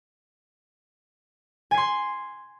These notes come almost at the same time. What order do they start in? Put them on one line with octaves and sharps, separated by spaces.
G#5 C7 C6